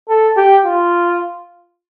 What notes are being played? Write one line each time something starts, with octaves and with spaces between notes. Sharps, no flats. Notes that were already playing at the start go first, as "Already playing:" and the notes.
A4
G4
F4